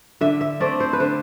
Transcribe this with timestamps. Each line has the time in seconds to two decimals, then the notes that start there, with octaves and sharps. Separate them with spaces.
0.21 D3 E5
0.41 E5
0.60 A3 C4 D5
0.80 C5
0.93 B4
1.00 D3 C5